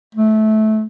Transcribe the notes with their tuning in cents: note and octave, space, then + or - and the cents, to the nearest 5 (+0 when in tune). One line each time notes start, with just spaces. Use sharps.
A3 -20